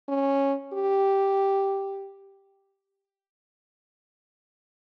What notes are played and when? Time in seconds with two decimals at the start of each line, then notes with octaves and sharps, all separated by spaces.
0.09 C#4
0.73 G4